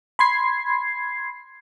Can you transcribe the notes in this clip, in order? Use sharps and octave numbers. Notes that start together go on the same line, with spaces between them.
B5 C6 G#6 C7